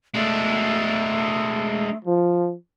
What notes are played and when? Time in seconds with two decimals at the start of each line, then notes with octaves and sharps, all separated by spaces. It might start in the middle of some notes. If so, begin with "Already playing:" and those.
0.14 G#3 A3 D4
2.05 F3